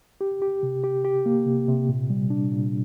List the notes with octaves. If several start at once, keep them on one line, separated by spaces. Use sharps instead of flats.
G4
G4
C3
G4
G4
A#3
C3
C3
A#2
G3
D4
A#2